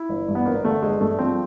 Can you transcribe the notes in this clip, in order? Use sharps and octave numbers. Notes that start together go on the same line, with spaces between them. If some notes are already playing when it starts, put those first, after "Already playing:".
Already playing: E4
G1
G2
B3
G1 A#3
D3 A3
G1 G#3
G2 A3
F3 C4